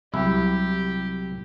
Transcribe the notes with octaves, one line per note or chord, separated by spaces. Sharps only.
C2 F#3 E4 G4 E6